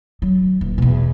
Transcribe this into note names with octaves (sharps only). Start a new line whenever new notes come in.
F#3
D#1
E2 B2